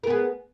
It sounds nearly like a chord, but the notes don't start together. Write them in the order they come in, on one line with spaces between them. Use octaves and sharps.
A#4 B3 G#4